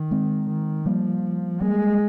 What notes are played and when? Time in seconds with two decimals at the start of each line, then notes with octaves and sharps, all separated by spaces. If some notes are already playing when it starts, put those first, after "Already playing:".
Already playing: D#3
0.11 G#3 C4
0.48 D#3
0.86 F3 G3 A#3
1.61 G3 G#3 A#3